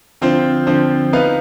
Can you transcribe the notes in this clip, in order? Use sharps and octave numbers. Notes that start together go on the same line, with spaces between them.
D3 F3 C4 F4 C5
D3 F3 C4 F4 C5
B3 D#4 B4 F5